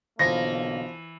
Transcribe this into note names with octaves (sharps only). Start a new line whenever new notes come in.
B1 D3 E3 F3 A#3 A#6